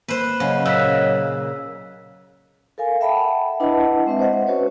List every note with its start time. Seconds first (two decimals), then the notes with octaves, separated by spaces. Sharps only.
0.08 A#3 B4 C5
0.40 C#3 F#3 C#5 D#5
0.65 A#2 E6 F#6 B6
2.78 A4 A#4 F5 G#5
3.01 E5 F#5 G5 A5 B5
3.60 D4 E4 B4 D#5 F#5 A5
4.06 G#3 C4 B4 E5
4.19 C5 D#5 F#5
4.47 C#4 F#4 B4 C#5